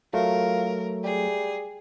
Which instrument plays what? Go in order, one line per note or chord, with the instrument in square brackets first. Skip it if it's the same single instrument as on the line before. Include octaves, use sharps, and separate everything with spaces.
[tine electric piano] F#3 A3 [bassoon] F4 [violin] A#4
[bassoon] G3 [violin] G#4